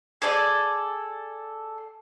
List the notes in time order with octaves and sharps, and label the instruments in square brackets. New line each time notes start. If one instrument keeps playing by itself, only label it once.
[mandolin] G#4 A4 D5 G#5